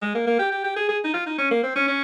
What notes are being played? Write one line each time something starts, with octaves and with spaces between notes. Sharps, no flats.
G#3
A#3
A#3
G4
G4
G4
G#4
G#4
D#4
F4
D#4
C#4
A#3
C4
C#4
C#4